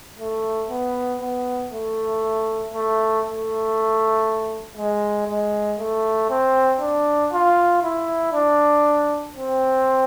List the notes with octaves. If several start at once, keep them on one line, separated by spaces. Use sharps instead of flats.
A3
B3
B3
A3
A3
A3
G#3
G#3
A3
C4
D4
F4
E4
D4
C4